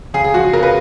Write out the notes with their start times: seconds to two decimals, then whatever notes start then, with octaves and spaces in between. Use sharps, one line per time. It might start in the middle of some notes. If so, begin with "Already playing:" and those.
0.14 C#3 G#4
0.24 G#4
0.34 F3 F#4
0.44 G#4
0.53 C#3 A#4
0.63 B4